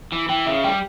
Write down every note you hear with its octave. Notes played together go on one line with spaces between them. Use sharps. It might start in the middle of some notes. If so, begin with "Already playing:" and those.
E3
E3 G5
C#3 E5
G3 G5